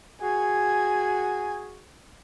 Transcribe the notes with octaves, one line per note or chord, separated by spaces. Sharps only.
F#4 G#4 G#5